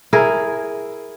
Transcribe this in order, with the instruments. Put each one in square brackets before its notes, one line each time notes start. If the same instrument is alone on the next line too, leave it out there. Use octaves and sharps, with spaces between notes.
[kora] E4 G#4 A#4